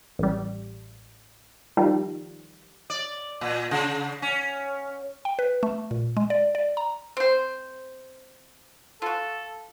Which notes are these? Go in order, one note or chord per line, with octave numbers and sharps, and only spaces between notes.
A1 G3
D#3 F3 G3
D5
A#2
C#3
C#4
G5
B4
A3
A#2
G#3
D5
D5
A#5
C4 C5
F4 F#4 A4